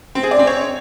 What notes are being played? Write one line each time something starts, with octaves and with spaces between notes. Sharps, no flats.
C4
G#4
D5
C4
C#5